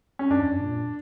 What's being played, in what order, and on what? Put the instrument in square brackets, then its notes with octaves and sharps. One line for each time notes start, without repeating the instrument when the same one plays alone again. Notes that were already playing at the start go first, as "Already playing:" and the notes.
[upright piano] C#4
[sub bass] F#2 [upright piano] D4
[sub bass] E2
F#2
A#2